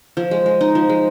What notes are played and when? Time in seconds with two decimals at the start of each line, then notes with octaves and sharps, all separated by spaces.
0.17 F3
0.31 G#3
0.46 G#3
0.61 D#4
0.75 F3
0.89 G#3